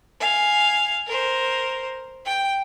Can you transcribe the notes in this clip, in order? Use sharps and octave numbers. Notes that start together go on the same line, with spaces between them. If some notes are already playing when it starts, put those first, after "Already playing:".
F5 G#5
A#4 C5
G5